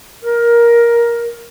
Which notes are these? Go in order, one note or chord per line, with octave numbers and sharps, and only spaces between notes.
A#4